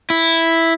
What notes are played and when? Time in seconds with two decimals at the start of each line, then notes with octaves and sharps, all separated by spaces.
0.10 E4